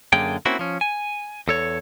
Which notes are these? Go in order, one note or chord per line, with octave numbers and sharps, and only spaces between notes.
F#2 D3 A#3 G#4 G5
A#3 C4 C#4 E4 F#4
F3 C#4
G#5
E2 A4 C#5